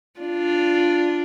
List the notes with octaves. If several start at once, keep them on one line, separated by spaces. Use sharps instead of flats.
D4 F4